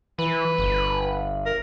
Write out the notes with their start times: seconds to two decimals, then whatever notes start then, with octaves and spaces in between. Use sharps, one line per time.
0.19 E3 B4
0.58 G1
1.45 A#4